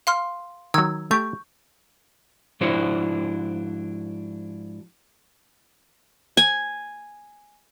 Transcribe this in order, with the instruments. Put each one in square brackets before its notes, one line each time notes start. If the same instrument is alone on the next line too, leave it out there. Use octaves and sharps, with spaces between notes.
[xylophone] F5 C6 F6
[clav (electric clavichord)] D#3 F#3 [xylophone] E6 G#6
[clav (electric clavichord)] A3 G4 [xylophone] C#6 G6
[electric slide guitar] G#2 F3 D4 E4 F#4 C5
[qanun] G#5